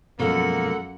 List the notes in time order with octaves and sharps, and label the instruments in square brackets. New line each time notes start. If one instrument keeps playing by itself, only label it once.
[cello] F#2 F#5 [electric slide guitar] B2 F3 G#3 [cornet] A#3 [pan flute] A4